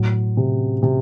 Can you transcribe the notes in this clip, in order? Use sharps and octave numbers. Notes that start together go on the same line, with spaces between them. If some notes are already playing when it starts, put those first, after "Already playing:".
Already playing: A2 F#3
C3
C3